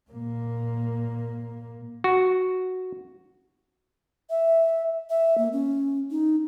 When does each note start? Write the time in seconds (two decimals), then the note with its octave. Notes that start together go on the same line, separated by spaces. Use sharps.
0.11 A#2 A#3
2.04 F#4
4.30 E5
5.10 E5
5.38 A#3
5.53 C#4
6.11 D#4